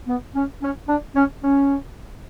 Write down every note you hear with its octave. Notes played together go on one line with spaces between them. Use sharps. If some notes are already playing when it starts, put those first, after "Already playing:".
B3
C#4
C#4
D4
C#4
C#4